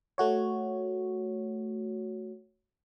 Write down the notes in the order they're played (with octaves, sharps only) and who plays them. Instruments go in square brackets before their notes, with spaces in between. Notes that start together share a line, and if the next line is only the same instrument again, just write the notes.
[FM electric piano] A3 F#4 C#5